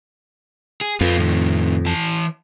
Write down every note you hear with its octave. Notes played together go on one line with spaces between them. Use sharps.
G#4
F2 F4 B4
A2 D#3
E3 A5